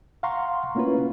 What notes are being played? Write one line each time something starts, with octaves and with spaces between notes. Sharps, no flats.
F5 F#5 A#5 C6 C#6
A3 A#3 C#4 E4 F4 B4